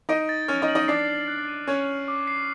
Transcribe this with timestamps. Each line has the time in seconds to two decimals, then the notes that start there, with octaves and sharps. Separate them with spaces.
0.09 D#4 D#5 D7
0.29 A6
0.48 C#4 C#5 F6
0.62 D#4 D#5
0.68 F#7
0.75 D#4 D#5
0.88 D4 D5 C7
1.08 A6
1.28 F#6
1.48 D#7
1.67 C#4 C#5 A6
1.88 F6
2.08 D6
2.27 C7